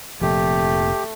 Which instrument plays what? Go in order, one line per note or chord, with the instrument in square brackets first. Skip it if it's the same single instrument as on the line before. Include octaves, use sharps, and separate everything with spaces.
[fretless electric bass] F1 F2 A#2 [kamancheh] A3 [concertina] G4